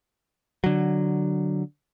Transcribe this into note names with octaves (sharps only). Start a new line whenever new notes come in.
D3 F#3